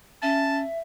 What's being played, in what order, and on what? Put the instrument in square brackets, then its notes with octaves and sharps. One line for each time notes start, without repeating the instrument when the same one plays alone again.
[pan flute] C#4 [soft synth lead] E5 [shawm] A5